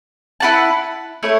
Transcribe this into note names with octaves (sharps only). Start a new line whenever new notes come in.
E4 B4 F#5 A5
A3 E4 A4 C#5